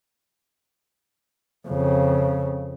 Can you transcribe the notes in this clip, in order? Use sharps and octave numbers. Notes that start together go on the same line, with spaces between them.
F2 C#3